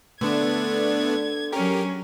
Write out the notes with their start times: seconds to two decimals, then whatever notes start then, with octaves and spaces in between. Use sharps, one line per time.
0.21 D3 A3 B3 D4 G#6
1.52 F#3 C#4 G4 A#4